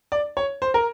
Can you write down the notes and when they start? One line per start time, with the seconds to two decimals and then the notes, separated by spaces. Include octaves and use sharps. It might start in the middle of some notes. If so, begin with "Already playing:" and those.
0.12 D5
0.37 C#5
0.62 C5
0.74 A#4